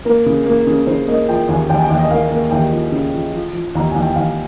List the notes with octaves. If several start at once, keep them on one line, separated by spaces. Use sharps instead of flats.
A#3 A#4
C#3
A#3
C#3
C#3 C5
A#3 D#5
F3 G5
D#2 G#5
D#2 G5
G#5
G5
D#2
D#5
A#3 F5
A#3
D#2 G5
F3
C#3
F3
F3
F3
D#2 A#5
D#2 G#5
G5
D#2 F5